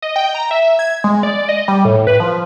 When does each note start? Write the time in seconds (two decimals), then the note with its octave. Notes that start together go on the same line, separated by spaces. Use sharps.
0.02 D#5
0.16 G5
0.34 A#5
0.51 E5
0.79 G#6
1.04 G#3
1.23 D5
1.49 D#5
1.68 G3
1.85 A2
2.07 B4
2.20 F3